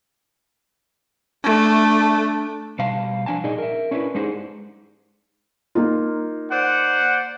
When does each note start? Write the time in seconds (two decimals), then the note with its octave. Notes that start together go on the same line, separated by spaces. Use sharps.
1.44 A3 D4
2.79 B2 G3 F5 A5
3.26 F3 D4 G#5 A5
3.44 A#2 D#4 G#4 D5 D#5
3.58 A#4 E5
3.91 C#4 D4 E4 G#4 B4
4.15 G#3 D4 D#4 G4 G#4 C5
5.75 A#3 D#4 F4
6.51 C5 D5 F#5